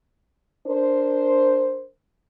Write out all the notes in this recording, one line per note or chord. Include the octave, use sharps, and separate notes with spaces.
D4 A#4 C5